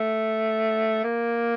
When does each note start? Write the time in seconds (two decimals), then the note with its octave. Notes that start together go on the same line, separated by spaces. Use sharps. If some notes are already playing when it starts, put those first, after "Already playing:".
Already playing: A3
1.04 A#3